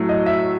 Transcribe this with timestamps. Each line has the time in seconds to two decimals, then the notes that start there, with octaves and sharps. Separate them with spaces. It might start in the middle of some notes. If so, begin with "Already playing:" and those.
Already playing: A2 F#3 A3
0.09 D#5
0.26 E5